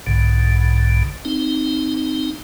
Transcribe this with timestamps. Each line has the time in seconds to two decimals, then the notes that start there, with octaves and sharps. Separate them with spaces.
0.07 B1 G#2 D3
1.25 C4 D#4